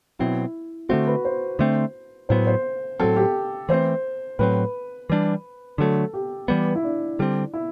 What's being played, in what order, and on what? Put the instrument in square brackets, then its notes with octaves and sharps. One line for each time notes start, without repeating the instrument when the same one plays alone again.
[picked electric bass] B2 F#3 C4 [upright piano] E4
[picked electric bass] D3 A3 C4 [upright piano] F#4
[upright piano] B4
C5
[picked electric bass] D3 A3 C4
[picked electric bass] A2 F#3 B3 [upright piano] C5
[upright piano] C5
[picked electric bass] A2 F#3 C4 [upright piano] A4
[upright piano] G4
[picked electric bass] E3 A3 C4 [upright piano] C5
[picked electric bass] A2 F#3 C4 [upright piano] B4
[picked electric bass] E3 G3 D4
[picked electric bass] D3 F#3 A3 [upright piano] A4
[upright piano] G4
[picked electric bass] E3 G3 B3
[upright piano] E4
D4
[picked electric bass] D3 G3 C4
[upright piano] E4